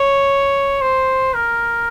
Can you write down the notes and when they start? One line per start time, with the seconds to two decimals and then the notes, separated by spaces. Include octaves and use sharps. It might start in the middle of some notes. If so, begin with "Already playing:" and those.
Already playing: C#5
0.81 C5
1.34 A#4